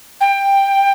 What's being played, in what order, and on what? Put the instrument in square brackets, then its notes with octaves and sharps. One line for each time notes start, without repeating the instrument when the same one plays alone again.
[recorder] G5